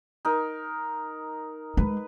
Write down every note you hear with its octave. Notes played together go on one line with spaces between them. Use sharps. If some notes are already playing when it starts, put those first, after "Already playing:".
D#4 A#4
G#3 B4